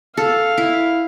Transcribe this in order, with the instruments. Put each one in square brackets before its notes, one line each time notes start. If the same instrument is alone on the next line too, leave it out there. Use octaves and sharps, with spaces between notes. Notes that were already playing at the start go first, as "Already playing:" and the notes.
[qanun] A4 [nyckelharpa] F5
[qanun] E4